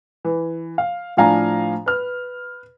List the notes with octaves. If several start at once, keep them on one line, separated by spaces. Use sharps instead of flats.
E3
F5
A2 F3 D4 F5 G#5 A#5
B4 F6